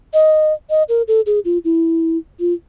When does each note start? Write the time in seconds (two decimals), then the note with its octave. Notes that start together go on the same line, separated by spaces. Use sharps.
0.14 D#5
0.70 D#5
0.89 A#4
1.08 A4
1.26 G#4
1.45 F4
1.65 E4
2.40 F4